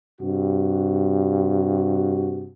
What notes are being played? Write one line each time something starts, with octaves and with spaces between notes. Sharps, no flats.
G2 C3 F#4